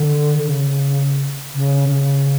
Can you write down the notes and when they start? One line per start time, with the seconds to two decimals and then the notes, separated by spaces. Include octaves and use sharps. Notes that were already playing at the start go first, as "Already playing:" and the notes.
Already playing: D3
0.39 D3
0.48 C#3
1.55 C#3
1.89 C#3